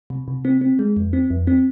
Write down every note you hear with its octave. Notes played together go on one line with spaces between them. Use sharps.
C3
C3
C4
C4
G#3
F2
C4
F2
C4